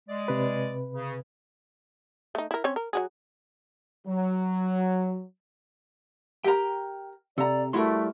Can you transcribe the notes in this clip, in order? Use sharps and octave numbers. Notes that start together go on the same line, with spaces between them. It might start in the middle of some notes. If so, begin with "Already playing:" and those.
G#3 D5
C3 B4
C#3
A3 D#4
E4 A#4
C4 C#4 C#5
A#4
F#3 F#4 G#4
F#3
G4 A#4 G5 A#5
C3 A4 D5 A#5
G3 A3 E4 F#4 A#4 C6